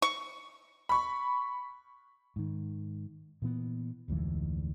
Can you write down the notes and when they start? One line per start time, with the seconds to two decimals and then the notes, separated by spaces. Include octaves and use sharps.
0.02 C#6
0.89 B5 C#6
2.36 G#2 D#3
3.42 A#2 E3 B3
4.08 F1 D2 G#2 E3